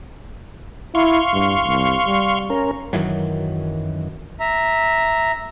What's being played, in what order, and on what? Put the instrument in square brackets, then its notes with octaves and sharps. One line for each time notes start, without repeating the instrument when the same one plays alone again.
[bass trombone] E4 [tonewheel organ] F5 C6 C#6
[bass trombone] G2
C2
G3
[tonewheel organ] C#4 A#4
[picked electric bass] F#2 D#3 E3 F#3
[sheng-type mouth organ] E5 A#5